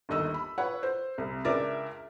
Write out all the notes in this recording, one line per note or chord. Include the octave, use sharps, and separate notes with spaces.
G1 D#2 D#5 E6
B5
B4 C#5 F#5
C5
C2
C#2 D4 A#4 E5 D6 A6